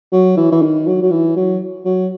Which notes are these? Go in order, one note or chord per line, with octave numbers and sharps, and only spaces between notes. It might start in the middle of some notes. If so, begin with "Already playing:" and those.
F#3
E3
E3
D#3
F#3
F#3
E3
F#3
F#3